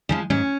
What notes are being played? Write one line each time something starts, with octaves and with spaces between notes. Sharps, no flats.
C#3 F3 G#3
G#2 C#4